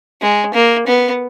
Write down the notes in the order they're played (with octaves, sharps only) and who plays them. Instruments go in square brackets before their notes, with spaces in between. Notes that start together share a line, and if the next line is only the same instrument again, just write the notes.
[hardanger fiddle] G#3
A#3
B3